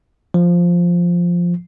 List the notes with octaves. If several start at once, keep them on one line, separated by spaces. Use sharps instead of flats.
F3